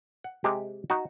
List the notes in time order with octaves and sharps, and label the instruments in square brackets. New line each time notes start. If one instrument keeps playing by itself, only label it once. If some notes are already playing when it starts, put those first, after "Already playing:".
[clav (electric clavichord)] F#5
C3 G#3 G4
D#4 F#4